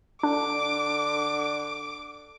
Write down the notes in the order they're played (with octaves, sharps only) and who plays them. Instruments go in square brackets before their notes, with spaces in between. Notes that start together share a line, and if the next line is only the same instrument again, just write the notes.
[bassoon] D3 [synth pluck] D4 [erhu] D6